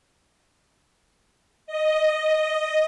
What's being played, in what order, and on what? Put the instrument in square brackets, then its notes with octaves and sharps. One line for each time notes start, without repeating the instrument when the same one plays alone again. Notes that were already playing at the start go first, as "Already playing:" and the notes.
[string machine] D#5